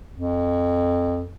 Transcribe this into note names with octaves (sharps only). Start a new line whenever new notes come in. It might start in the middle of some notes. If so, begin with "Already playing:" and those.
F2